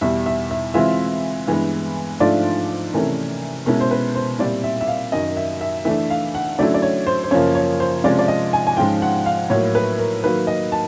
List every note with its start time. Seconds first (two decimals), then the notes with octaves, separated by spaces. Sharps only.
0.01 E2 B2 G3 E5
0.26 E5
0.51 E5
0.74 E3 G#3 C4 F4 E5
1.47 G2 E3 G#3 B3
2.20 G#2 F3 A3 D4 F4 D5
2.93 C3 E3 A3 C#4 A#4
3.66 B2 G#3 C#4 E4 A#4
3.81 C5
3.91 B4
4.15 C5
4.39 A#2 G3 C4 E4 D5
4.64 E5
4.81 E5
4.88 F5
5.12 F#2 D#3 F#3 D#5
5.37 E5
5.61 E5
5.85 E3 A3 D4 E5
6.10 F5
6.35 F#5
6.58 D3 F#3 A3 C#4 E4 D5
6.74 D5
6.82 C#5
7.07 C5
7.24 C5
7.31 F#2 C#3 F3 A#3 C#5
7.55 C#5
7.80 C5
8.04 C3 F3 G#3 C#4 D5
8.19 D5
8.28 D#5
8.53 G#5
8.67 G#5
8.77 G#2 F3 G#3 C#4 F4 G5
9.02 F#5
9.26 F5
9.50 A2 F#3 A#3 C#5
9.75 B4
9.98 A#4
10.24 D#3 F#3 A#3 B4
10.47 D#5
10.72 A5